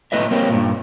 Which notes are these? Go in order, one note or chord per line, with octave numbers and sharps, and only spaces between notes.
A3 E4 B4 D#5 E5
G3 A#3 C4 C#4
G2 A#2